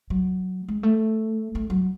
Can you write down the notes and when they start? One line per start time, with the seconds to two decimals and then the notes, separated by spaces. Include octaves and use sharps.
0.10 F#3
0.68 G#3
0.83 A3
1.55 A3
1.70 F#3